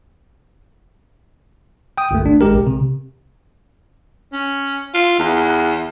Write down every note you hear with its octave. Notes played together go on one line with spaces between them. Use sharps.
G5 D#6
G1 C2 A3
D4
G#1 G#3 G4 A#4
B1
C3
C#4
F4
E2